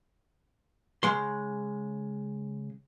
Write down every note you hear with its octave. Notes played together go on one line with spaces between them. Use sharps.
C#3 G#3 C6